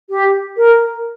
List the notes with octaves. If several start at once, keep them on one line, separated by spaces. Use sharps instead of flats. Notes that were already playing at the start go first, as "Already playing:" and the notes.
G4
A#4